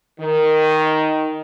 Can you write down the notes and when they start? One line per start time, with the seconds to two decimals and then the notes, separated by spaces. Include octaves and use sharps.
0.20 D#3